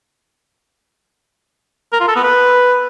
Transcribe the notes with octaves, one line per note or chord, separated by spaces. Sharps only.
A#4
F4
A4
B3
B4